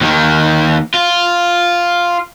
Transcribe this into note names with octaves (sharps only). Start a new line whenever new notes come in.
D#2 D#3
F4